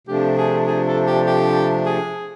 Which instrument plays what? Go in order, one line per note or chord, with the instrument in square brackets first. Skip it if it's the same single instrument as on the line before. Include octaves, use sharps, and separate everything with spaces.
[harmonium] C3 F3 A3 D4 [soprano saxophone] G4
[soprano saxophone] G#4
G#4
A4
G4
G4
G#4